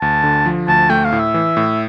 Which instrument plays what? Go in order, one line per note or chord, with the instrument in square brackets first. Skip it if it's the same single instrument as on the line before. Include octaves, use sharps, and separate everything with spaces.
[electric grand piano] D2 [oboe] A5
[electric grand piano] D3
F3
[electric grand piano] D2 [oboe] A5
[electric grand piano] A3 [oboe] G5
[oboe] F5
[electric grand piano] A2
[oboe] E5
[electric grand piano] E3
A2